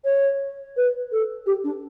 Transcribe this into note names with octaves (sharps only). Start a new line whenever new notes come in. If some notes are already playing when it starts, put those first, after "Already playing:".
C#5
B4
A4
G4
D4